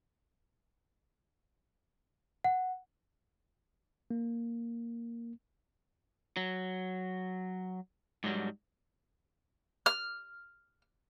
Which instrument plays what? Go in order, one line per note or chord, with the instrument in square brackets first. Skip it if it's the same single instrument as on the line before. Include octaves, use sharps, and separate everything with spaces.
[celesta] F#5
[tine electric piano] A#3
[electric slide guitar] F#3
G#2 F#3 G3
[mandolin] F6